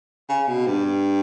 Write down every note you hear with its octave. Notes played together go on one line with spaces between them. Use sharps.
C#3
B2
G2